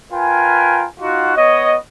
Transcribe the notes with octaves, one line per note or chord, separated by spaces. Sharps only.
F4 A#4 B4 G5 G#5
D#4 F4 F#4
B3 C#5 D#5